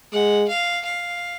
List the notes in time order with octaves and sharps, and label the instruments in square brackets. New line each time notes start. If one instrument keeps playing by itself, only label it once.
[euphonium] G#3 [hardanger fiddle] F#5
[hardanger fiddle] F5
F5